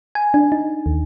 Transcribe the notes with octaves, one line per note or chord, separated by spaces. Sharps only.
G#5
D4
D#4
D#2